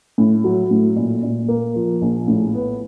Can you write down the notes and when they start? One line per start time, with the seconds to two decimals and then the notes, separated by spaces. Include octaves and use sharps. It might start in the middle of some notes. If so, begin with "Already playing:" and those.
0.18 A2
0.44 F#3
0.71 A2
0.96 A#2
1.23 A#2
1.48 A#3
1.76 F3
2.02 A#1
2.28 A2
2.54 B3